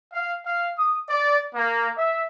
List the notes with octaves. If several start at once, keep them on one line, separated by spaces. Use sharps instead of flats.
F5
F5
D#6
D5
A#3
E5